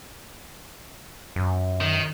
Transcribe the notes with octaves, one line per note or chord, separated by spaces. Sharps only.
F#2
D#3